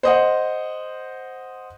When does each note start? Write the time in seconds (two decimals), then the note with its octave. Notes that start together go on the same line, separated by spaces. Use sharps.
0.03 C5 D#5 F#5